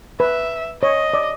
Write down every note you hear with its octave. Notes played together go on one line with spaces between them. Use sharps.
B4 E5
C#5 D#5
D5